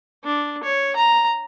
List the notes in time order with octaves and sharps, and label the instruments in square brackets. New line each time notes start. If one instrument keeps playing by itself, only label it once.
[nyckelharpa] D4
C#5
A#5